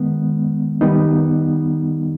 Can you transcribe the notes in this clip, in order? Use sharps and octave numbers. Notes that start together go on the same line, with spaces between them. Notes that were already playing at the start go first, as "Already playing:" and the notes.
Already playing: D#3 G#3 B3
D#3 G3 B3 D#4